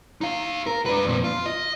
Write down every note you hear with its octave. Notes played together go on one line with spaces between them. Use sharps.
D#4 F5
A#4
D4 B4
F2 A#2
F4
D#5